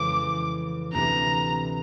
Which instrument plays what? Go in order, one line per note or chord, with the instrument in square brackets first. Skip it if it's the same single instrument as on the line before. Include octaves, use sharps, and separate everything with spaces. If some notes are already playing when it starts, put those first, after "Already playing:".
Already playing: [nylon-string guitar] F2 C#3 E3 G#3 C#4 [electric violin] D6
[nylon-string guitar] D2 C3 E3 [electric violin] A#5